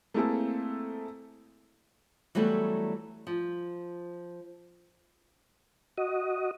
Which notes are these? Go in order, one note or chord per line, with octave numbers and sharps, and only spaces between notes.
A3 A#3 C4 E4 G#4 A4
E3 F#3 G3 A3 B3
F3
F#4 D#5